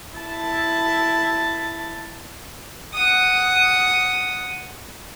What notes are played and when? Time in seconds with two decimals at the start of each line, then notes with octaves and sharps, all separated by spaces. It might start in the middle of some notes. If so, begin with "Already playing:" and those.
0.16 E4 A5
2.93 F#5 D#6